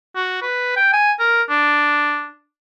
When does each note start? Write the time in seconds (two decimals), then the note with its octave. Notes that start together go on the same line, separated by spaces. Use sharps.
0.16 F#4
0.42 B4
0.76 G5
0.93 G#5
1.20 A#4
1.50 D4